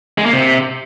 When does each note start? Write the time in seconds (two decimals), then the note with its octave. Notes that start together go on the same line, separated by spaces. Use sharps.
0.18 G#3
0.26 A#3
0.33 C3